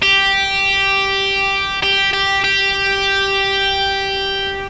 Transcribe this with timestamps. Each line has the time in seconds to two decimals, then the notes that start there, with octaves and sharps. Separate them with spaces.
0.02 G4
1.83 G4
2.13 G4
2.44 G4